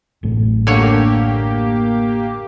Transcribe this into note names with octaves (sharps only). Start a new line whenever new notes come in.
A1 F#2 A2
D3 A#3 G4 C#5